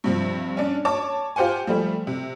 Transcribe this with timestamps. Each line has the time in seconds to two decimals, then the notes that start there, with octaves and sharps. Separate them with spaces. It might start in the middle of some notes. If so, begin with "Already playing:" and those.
0.04 G2 C3 F3
0.57 C#4 D4
0.85 C#5 A5 D6
1.36 F4 G4 C5 F#5 G#5
1.67 F3 G3 A3
2.07 C3